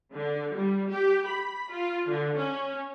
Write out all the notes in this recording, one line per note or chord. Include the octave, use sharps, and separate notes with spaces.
D3
G3
G4
B5
F4
D3
C#4